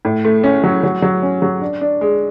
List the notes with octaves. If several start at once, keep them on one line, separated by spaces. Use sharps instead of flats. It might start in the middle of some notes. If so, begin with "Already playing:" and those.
A2
A3
C#4
F#3
F#3
F#3
C#4
F#3
D4
D4
G#3